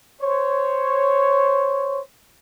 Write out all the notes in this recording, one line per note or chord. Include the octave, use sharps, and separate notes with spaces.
C5 C#5